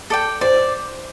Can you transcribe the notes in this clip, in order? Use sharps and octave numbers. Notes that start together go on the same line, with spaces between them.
A4 D5 G5
C5 D5